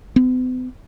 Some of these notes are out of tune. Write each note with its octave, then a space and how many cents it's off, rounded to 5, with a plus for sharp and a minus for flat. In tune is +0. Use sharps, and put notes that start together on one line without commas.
B3 +45